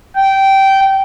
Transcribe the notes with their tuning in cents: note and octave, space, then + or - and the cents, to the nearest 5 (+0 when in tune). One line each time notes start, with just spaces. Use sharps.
G5 -15